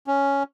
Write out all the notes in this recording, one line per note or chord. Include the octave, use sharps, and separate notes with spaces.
C#4